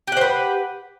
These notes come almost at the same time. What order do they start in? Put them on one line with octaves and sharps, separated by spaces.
G4 F#5 C5 B4